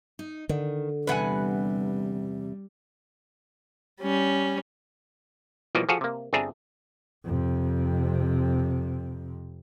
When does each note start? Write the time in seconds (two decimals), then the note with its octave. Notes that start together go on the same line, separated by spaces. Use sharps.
0.19 D#4
0.49 D3 D#3
1.07 E2 C3 G3 B4 F#5 G#5
4.02 G3 C#4
5.75 B2 E3 F3 G3 A#3
5.89 F3 F#4 G#4 A4 F5
6.01 C3 A#3
6.33 G1 C4 D4 G#4 E5 A#5
7.25 F2 C3